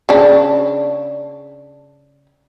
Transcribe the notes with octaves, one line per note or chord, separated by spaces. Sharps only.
C#3 D4